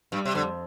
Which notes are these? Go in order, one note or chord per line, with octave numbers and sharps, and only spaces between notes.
G2 G3
C3
F2 D3